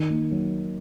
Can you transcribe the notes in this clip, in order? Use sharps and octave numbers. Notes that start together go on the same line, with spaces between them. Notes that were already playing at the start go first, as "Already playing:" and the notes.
Already playing: D#3 D#4
A#3
F#3